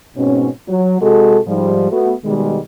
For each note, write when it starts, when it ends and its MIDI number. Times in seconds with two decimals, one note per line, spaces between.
0.16 0.47 44
0.16 0.47 47
0.16 0.47 60
0.16 0.47 61
0.67 0.96 54
1.01 1.38 48
1.01 1.38 56
1.01 1.38 66
1.01 1.38 69
1.46 1.90 44
1.46 1.90 53
1.46 1.90 55
1.90 2.13 57
1.90 2.13 59
1.90 2.13 66
2.24 2.58 47
2.24 2.58 51
2.24 2.58 55
2.24 2.58 56